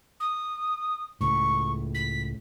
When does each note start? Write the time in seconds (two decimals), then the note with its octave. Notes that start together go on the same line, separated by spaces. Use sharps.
0.20 D#6
1.21 C#2 A2 C#6
1.94 B6